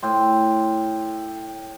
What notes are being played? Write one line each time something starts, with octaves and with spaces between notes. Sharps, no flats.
A2 G5 C6